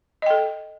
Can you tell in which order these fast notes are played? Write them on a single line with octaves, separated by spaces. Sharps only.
D#5 G5 A4